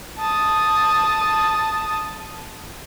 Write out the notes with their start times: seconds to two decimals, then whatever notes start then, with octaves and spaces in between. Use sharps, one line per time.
0.19 A5 D#6